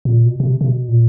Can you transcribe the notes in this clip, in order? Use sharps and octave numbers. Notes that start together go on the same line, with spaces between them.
A#2
B2
B2
C3
C3
B2
A#2